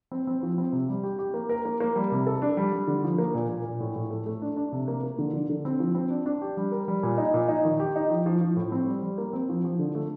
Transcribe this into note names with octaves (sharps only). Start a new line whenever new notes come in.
C4
C4
F3
C4
C3
G3
G4
G4
A#3
A#4
A#3
A#3
G3
C3
A4
D4
G3
G3
D3
F3
A#3
A#2
A#2
A#2
A2
A2
A3
A3
D4
D4
C3
A#3
A#3
D3
D3
D3
C4
F3
C4
D4
D4
G4
G3
A#4
G3
A#2
D#4
A#2
D#4
D#3
G4
D#4
F3
F3
F3
A2
C4
G3
G3
A#3
C4
F3
F3
D3
A3